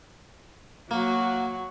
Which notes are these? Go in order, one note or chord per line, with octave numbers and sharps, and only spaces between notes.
F#3 A#3 F#4